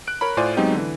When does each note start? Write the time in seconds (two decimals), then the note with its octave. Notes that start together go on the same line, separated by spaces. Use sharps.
0.07 F#6 D7
0.21 A#4 C#5 A#5 B5
0.37 A2 F4 C5 D5 G#5 D#7
0.57 F#3 G#3 B3 C4 D#4 G4
0.74 D3 E3